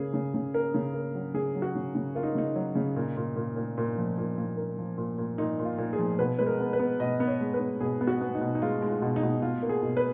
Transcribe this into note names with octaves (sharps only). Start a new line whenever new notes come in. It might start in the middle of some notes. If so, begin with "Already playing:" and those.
Already playing: C#3 A#3 G#4
C#3
C#3
A#3 A#4
C#3
A#3
F#3
C#3 G#4
F#3
F#4
C#3
C#3
A#3 F4
D#4
C#3 D#4
F#3
C#3
A#2
A#2
A#2
A#2
A#2
F3
A#2
A#2
A#3
F3
A#2
A#2
A#2 D#4
A#2
F4
A#2
G#4
F3
B2 B4
G#3 B4
A#4
B3
B4
B3
B2 D#5
B3
C#5
G#3
B4
B3
B2 G#4
B3
F#4
B3
D#4
B2
D#4
G#3 F4
G#3
F4
B2
D#4
B2
B2 F4
A#3
G#4
B2
B4